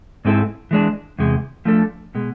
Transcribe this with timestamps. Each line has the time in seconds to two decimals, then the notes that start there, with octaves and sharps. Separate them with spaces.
0.25 G#2 G#3 C4 E4 A4
0.71 E3 G#3 D4
1.19 E2 C3 G#3
1.65 F3 A3 D4 A4
2.15 B2 G#3